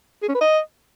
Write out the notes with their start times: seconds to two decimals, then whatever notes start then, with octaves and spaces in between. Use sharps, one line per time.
0.23 G#4
0.29 C#4
0.35 B4
0.41 D#5